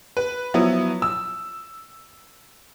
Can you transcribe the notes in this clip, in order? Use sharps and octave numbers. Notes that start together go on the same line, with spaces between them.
B4
F3 F#3 B3 E4
E6